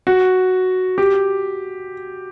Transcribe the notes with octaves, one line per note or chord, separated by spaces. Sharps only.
F#4
G4